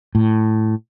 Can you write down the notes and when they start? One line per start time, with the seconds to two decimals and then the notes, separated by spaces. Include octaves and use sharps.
0.15 A2